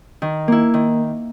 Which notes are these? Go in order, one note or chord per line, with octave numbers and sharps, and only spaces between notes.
D#3
A#3 E4
D#3